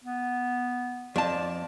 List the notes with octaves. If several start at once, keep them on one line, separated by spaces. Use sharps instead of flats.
B3
F2 D5 A5